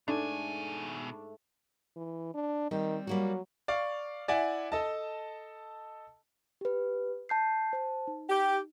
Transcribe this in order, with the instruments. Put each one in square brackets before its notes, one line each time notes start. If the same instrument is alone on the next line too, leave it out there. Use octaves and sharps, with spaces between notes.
[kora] G#2 [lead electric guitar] B2 G#5 [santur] A3 [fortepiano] D4
[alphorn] E3
D4
[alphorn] D#3 [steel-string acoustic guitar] G3 C4 G4
[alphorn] F#3 [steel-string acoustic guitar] G3 A#3 F#4
[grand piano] D5 F5 C#6
E4 D5 E5 F#5 G#5
A4 D#5 A5
[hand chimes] G4 B4
A5 G6 C7
C5 A5
D#4
[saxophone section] G4